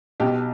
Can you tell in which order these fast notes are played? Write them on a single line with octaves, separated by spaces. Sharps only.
B1 G4 B2